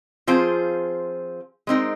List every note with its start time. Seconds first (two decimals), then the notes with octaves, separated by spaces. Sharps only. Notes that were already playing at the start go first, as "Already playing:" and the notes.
0.27 F3 C4 F4 G#4 C5
1.67 G#3 C4 D#4 A#4